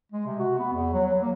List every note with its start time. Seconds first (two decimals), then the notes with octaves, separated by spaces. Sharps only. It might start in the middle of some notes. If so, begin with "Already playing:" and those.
0.12 G#3
0.26 C3
0.39 F#4
0.59 B3
0.73 E2
0.93 F#3
1.05 F#3
1.21 A#3